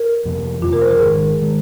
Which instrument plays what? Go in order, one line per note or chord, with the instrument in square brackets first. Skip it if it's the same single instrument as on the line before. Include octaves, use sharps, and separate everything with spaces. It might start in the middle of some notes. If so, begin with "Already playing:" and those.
Already playing: [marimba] A#4
[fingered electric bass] F2 C3 F3 A#3
[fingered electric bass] F2 C3 F3 A#3 [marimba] F4
[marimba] A#4
C5
A#4
[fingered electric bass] G#1 G#2 D#3 G#3 [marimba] G#4
[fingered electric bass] D#3 G#3